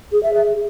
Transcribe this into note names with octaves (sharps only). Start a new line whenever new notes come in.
G#4
E5
G#4